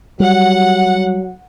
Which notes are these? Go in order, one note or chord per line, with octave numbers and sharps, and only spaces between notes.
F#3 G3 F#5